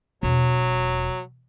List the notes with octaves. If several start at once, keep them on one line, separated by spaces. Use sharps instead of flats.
E1 F#3